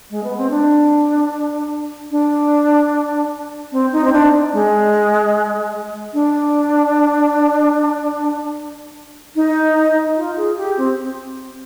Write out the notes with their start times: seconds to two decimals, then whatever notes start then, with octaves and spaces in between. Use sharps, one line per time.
0.10 G#3
0.24 B3
0.37 C4
0.50 D4
2.11 D4
3.72 C4
3.93 D#4
4.04 C4
4.13 D4
4.53 G#3
6.14 D4
9.36 D#4
10.17 F4
10.37 G#4
10.57 G4
10.78 C4